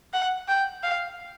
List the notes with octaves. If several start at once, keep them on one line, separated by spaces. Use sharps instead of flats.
F#5
G5
F5